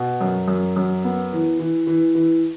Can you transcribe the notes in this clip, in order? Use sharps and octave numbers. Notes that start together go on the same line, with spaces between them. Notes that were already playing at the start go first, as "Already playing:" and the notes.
Already playing: B2
F#2
F#2
F#2
B3
E3
E3
E3
E3